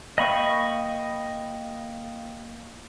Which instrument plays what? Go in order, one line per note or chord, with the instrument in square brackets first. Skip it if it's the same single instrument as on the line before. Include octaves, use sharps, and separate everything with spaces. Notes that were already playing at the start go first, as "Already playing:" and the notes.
[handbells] A#3 F5 G5 [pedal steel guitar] D#5 B5 C#6